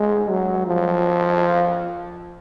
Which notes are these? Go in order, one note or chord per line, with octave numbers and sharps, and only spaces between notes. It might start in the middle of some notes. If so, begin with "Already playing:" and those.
Already playing: G#3
F#3
F3